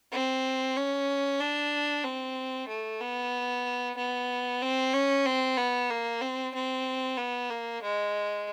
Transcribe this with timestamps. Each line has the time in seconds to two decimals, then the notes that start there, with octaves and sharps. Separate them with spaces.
0.12 C4
0.76 C#4
1.40 D4
2.04 C4
2.69 A3
3.00 B3
3.97 B3
4.62 C4
4.93 C#4
5.25 C4
5.57 B3
5.90 A#3
6.21 C4
6.54 C4
7.17 B3
7.50 A#3
7.82 G#3